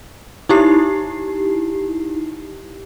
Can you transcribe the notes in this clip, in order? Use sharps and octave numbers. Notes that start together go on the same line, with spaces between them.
D#4 E4 G4 C7